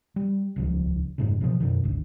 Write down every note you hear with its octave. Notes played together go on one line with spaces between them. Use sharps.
G3
D#1 C#2 F3
F1 G#2 C#3
E2 B2 D#3 F3
F#2 B2 D#3
G#1 D2